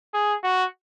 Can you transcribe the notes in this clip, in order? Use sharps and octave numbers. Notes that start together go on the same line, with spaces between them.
G#4
F#4